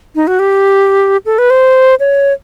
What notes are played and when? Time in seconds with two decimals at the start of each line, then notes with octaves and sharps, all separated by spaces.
0.16 D#4
0.27 F#4
0.39 G4
1.26 A4
1.38 B4
1.50 C5
2.00 C#5